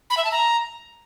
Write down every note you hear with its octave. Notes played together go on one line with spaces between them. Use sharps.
B5
E5
A5
A#5